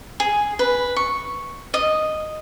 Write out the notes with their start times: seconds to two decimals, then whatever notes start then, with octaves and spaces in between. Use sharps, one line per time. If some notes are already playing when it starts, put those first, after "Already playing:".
0.20 G#4
0.59 B4
0.96 C#6
1.74 D#5